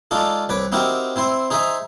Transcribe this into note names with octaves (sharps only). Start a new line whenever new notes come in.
G#3 D4 D#4 F4 A4
C2 B4 C#5 D6
C4 D#4 E4 F#4 G4 A#4
C4 E4 C5 C6
D#4 G#4 C5 E5 A#5 D#6